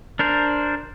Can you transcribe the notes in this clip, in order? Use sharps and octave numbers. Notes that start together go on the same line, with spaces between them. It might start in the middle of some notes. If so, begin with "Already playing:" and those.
D4 A#4 C5